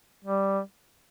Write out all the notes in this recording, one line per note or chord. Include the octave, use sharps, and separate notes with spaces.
G3